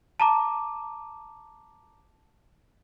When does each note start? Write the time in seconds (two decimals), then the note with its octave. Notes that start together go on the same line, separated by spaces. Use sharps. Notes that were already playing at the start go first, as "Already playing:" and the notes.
0.20 A5 A#5 D6